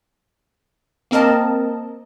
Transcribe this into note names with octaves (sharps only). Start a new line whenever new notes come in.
A#3 C4 A#4 D#5 A5